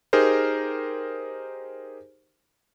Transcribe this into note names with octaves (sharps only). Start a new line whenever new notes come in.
D#4 G4 G#4 A#4 C5